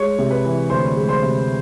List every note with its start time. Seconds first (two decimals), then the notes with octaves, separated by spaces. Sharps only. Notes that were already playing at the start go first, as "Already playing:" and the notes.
Already playing: G#3 C#5 C#6
0.19 C3
0.31 B4 B5
0.45 E3
0.70 D2 C5 C6
0.95 G#3
1.09 C5 C6
1.22 C3